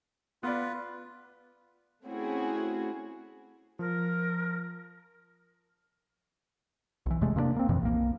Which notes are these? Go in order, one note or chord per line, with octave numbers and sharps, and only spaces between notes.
B3 F4 B4 D5
A3 C4 C#4 E4 F#4 G#4
F3 A#4
B1 E3
E2 C3 G#3 A3
C3 A#3 B3 D4
A#3 C4
F2 A#2 E3 F3
B1 A#3